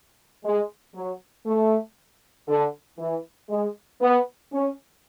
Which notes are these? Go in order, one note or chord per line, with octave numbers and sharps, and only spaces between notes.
G#3
F#3
A3
D3
E3
G#3
B3
C#4